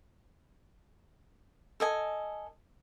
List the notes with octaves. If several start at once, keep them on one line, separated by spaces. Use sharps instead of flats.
A4 D#5 G#5